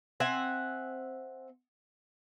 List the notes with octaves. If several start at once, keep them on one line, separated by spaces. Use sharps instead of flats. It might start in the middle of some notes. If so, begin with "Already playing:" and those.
C4 E5 F#5 G#5